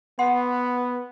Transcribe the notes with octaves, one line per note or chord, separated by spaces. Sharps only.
B3 F#5 C6